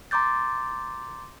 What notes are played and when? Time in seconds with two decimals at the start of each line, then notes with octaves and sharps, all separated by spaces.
0.11 A#5 C6 D6 G6 A6